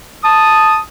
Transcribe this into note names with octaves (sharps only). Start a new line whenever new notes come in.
A5 D#6